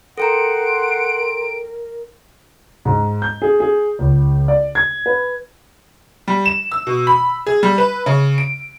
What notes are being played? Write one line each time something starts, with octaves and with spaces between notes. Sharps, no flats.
A4 A#4 F#5 G5 A#5 C6 D7
G#2
G6
G#4
G#4
C#2
D5
G#6
B4
G3
E7
E6
B2
B5
G#4
G3
B4
C#3
D7